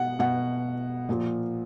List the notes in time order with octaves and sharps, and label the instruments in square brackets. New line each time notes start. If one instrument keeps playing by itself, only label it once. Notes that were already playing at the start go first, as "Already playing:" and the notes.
Already playing: [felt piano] B2 F#5
B2 F#5
A#2 F3